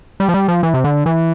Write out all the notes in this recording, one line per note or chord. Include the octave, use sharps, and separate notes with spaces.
G3
F3
G3
F3
E3
C3
D3
E3